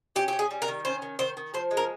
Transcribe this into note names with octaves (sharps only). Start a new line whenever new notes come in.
C#4 G4
C#4 G4
G#4
G3
A#4
D#3
C#4 C5
D#3
D#3 C5
D#3
F3 C5
G#3
A#4